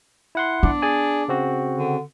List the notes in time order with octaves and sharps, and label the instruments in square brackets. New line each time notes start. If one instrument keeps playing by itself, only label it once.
[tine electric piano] E4 F#5 C6
[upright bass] B3 [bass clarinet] D4
[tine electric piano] G#4 D5 G#5
C#3 C4 F#4
[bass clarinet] D3